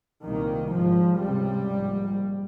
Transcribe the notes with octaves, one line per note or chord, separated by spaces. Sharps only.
C2 A#2 D#3
G#1 G#2 F3
C#2 C3 G3
A#1 G#2